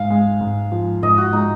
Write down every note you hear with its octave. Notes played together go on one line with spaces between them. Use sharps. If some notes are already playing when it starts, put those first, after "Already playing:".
Already playing: G#2 F5
G#3
G#2
F3
G#2 D#5
F#4
G#3 D#4